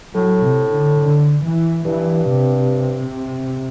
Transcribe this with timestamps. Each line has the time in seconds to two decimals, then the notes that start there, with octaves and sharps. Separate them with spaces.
0.15 A2 F#3
0.44 C3
0.72 D3
1.00 D3
1.43 E3
1.85 G2 E3
2.28 C3